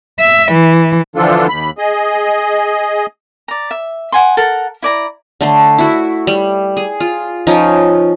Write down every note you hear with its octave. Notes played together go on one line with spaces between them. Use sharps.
E5
E3
D3 E3 F3 D4 F4 A4
D#2 B5
G#4 D#5
D5 A#5
E5
F#5 G#5 C6
A4 A#4 F#5
E4 D5 A#5
D3 A3 C6
E4 F#4
G3
G#4
F4
F3 C#4 D#4